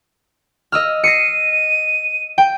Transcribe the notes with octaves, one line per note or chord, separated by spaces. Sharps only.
D#5 E6 F6
A#6 C7 C#7 D#7
G5